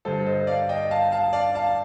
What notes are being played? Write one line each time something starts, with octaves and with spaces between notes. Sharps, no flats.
G2 D3 G3 A4 C5
C5 D#5
D5 F5
D#5 G5
F5 A5
F5 A5
D5 F5
F5 A5